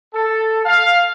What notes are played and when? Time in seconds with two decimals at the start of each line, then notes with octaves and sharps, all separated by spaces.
0.14 A4
0.65 F5